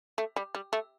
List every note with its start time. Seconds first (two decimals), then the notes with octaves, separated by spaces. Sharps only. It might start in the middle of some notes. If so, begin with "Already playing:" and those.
0.18 A3
0.36 G3
0.55 G3
0.73 A3